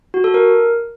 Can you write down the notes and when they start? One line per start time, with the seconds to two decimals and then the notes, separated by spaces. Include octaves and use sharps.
0.14 F#4
0.24 A4
0.34 A#4